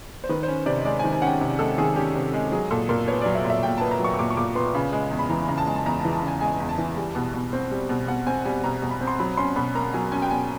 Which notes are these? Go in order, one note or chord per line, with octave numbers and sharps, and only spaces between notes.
C5
D#3 B4
C5
C#4 C#5
C3 D5
D#5
G#3 D5
G#5
D#3
G#5
C#4 F#5 G5
C3
G#3 A4
D#3 G#4
C#4 G4
C3
G#3
F#3 G#4
A#2 A4
A#2 A#4
B3 C#5
F#3 D5
E5
A#2
E5
A#2 G5
B3 A5
A#5
F#3 C#6
C#6
A#2 D6
C#6
A#2 D6
B3 C6
C#3 B5
G#3
E2
B5
E3 A#5
C#3 A#5
A5
G#3
A5
E2 A#5
A5
E3
A5
C#3 G#5
G#3 G#5
E2
A5
E3
G3
B2
B2
C4
G3
B2
B2 F#5
C4 G#5
G3 G#5
B2 A#5
B2
B5
C4
C6
F#3 B5
C#4 C6
B2 B5
A#3 A#5
F#3 G#5
C#4 G#5
G5
B2 G#5